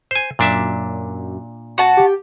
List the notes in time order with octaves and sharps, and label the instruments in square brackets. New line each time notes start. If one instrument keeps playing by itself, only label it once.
[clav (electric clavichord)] C5 G#5
[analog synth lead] F#2 [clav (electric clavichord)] A#2 D4 E5
[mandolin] F#4 A5
[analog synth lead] G4